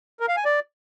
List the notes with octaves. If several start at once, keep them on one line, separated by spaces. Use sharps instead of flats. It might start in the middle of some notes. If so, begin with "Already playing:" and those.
A#4
F5
G#5
D5